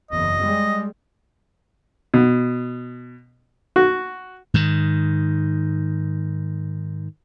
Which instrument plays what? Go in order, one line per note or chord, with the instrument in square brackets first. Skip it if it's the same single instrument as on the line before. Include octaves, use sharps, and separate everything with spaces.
[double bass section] F#1 E2 [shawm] D#5
[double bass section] G3 G#3
[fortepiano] B2
F#4
[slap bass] G#2 D#3